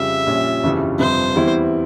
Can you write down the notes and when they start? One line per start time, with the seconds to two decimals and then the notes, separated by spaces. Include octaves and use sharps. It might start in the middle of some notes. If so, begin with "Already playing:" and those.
Already playing: F2 C#3 G3 E5
0.27 A#1 A#2 G3 C#4
0.63 G1 F2 C#3 E3 G3
0.98 G1 F2 C3 F3 C5
1.35 E2 E3 G3 C4 E4